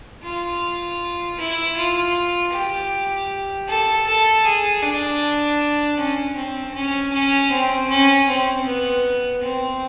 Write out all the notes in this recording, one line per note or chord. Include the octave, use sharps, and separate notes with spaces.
F4
E4
F4
G4
A4
A4
G#4
D4
C#4
C4
C#4
C#4
C4
C#4
C4
B3
C4